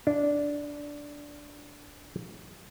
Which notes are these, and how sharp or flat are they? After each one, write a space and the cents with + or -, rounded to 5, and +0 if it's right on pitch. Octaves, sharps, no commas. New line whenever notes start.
D4 -10